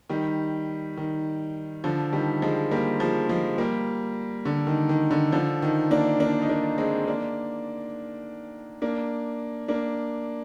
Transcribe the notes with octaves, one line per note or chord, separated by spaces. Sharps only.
D#3 G3
D#3
D3 F3
D#3 G3
F3 G#3
G3 A#3
F3 G#3
F3 G#3
G3 A#3
D3
D#3
D#3
D3
D3 F3
D#3
A#3 D4
A#3 D4
D#4
A#3 D4
G#3 C4
A#3 D4
A#3 D4
A#3 D4